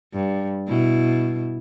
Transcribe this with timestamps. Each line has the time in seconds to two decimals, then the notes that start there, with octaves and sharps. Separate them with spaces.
0.14 G2
0.68 B2 E4